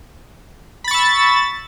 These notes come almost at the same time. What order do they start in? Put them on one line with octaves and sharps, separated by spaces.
B5 A6 C#6 E6